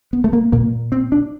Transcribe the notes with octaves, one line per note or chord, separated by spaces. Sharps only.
B3
A3
A#3
A#2 A#3
C4
D4